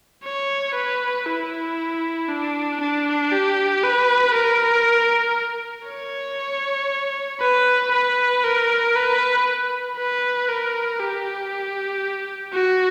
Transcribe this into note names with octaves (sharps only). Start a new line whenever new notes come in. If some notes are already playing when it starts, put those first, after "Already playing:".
C#5
B4
E4
D4
D4
G4
B4
A#4
C#5
B4
B4
A#4
B4
B4
A#4
G4
F#4